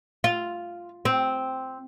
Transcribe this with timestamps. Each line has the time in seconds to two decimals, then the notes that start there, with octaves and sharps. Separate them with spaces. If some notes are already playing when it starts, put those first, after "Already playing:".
0.24 F4
1.05 C4